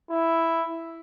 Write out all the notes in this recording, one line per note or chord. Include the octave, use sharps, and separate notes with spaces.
E4